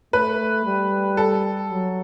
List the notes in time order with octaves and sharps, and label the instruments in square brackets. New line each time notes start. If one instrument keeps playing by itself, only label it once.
[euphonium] A3 [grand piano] B4
[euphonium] G3
[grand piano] A4
[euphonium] F#3